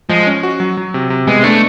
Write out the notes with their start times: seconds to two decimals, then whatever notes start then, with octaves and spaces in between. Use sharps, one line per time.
0.09 F3 G#3
0.27 C#4
0.43 F#4
0.60 F#3
0.77 F#3
0.94 C3
1.10 C3
1.27 G#3 B3
1.44 A3 D4